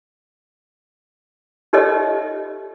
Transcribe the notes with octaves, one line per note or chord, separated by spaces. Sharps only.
D#4 G4 A4 C#5 D#5 E5